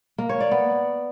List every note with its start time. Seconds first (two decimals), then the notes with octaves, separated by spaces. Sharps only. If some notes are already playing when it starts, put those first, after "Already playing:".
0.18 A#3
0.29 C#5
0.40 D5
0.51 B3